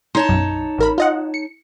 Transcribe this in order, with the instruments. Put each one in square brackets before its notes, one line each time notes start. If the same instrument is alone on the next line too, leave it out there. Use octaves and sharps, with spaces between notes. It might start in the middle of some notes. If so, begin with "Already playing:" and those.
[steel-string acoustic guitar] D#4 C#5 A5 [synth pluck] C6
[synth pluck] B1 F#2
A1 A#4 B5
F4 D#5 F#5
C#7